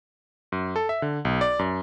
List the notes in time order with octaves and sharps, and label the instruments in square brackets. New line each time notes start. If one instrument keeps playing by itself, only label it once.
[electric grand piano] F#2
A4
E5
D3
B1
D5
F#2